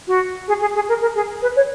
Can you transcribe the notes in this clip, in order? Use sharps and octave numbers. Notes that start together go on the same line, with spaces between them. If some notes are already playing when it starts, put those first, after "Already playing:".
F#4
G#4
G#4
G#4
A#4
A#4
G#4
B4
C#5